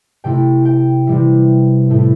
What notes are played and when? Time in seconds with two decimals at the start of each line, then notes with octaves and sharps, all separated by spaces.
0.24 C3 A3 E4 G5
0.65 G5
1.07 C3 E3 G3 E4
1.90 A2 A3 E4